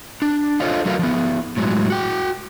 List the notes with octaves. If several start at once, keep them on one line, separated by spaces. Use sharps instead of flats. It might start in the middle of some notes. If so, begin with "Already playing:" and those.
D4
F4 A4 C5 C#5 D#5 F5
F#3 A3 F#4 A#4 B4 F5
F3 B3
A2 F#3 G#3
F#4 G5